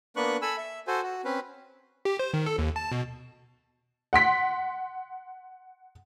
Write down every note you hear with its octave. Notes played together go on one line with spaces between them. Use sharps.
A#3 B3 D4 B4 C#6 F#6
A4 G#5 B5 E6
E5
F#4 A4 C5 G#5
F#4
C4 C#4 B4
G4
C5
D#3
A4
D#2
A5
B2
F#5 C6 B6